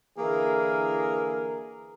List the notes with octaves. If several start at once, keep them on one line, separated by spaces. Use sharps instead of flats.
D3 E3 A#3 E4 G#4 A#4